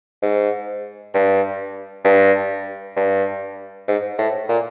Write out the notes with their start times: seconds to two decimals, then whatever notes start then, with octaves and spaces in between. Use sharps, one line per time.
0.22 G#2
1.14 G2
2.05 G2
2.97 G2
3.88 G#2
4.18 A2
4.49 A#2